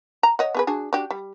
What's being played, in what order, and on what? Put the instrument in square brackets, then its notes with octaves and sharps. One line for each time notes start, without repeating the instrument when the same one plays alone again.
[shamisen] A#5
C#5 D#5 F#5
B3 G#4 B4
D4 F#4 G#4
D4 F#4 G4
G3